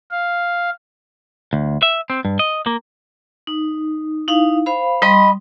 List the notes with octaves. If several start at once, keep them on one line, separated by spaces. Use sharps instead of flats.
F5
D2
E5
C4
G2
D#5
A#3
D#4
D#4 E4 F5
C5 F5 B5
G3 D#5 B5 C6